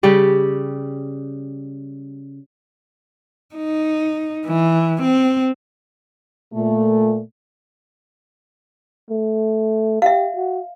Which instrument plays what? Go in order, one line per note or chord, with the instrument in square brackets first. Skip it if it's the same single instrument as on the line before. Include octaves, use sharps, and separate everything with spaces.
[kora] C#3 G3 G4
[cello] D#4
E3
C4
[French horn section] A#2 A3
[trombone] A3
[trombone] G4 [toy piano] E5 F5
[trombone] F#4